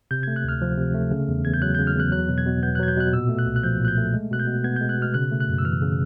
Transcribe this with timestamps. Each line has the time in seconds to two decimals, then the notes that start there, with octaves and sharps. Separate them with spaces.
0.11 C3 G6
0.23 G#6
0.28 A3
0.36 F#6
0.44 D2 F6
0.62 F3
0.78 C3
0.94 A3
1.11 C#3
1.28 E2
1.45 E2 G#6
1.54 G6
1.62 F#3 F#6
1.75 G6
1.79 C#3
1.87 F6
1.95 E2 F#6
2.12 F#3 F#6
2.29 B2
2.38 G#6
2.46 B2
2.63 B3 G6
2.75 F#6
2.79 F#3 G#6
2.88 G6
2.97 B2 F#6
3.13 A#2 E6
3.29 A3
3.39 F#6
3.46 C2
3.56 F#6
3.63 F3 G6
3.80 A#2 F#6
3.88 G6
3.98 A3
4.14 G#3
4.31 B2 F#6
4.39 G6
4.47 B2
4.64 B3 G#6
4.76 G6
4.81 G#3
4.89 F#6
4.98 B2 F6
5.14 C#3 F#6
5.31 A3
5.40 F#6
5.48 F#2
5.58 E6
5.65 E3 F6
5.82 C#3